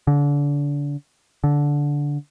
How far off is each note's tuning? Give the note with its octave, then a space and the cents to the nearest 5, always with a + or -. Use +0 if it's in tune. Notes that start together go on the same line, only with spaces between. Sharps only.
D3 -30
D3 -15